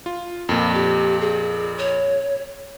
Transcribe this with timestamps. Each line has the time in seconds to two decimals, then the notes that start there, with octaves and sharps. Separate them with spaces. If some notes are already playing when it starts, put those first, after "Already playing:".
0.06 F4
0.49 F2 A#2
0.73 G4
1.20 G#4
1.78 C#5